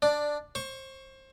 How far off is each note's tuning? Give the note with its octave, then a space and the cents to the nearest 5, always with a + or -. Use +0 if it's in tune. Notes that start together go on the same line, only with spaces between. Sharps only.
D4 +0 D5 +10
C5 +25 C#6 +0